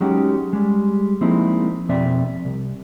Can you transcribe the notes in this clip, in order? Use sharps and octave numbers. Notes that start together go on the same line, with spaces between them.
F#3 G#3 C#4 D#4 F#4 G4
G3 G#3
F3 G#3 A#3 C4 D#4 E4
F2 B2 C4 D5 E5
C2